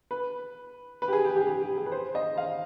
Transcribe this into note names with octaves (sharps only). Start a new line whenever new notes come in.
B4
B4
G4
G#4
G4
G4
G#4
G4
G4
G#4
B4
C5
D#5
F5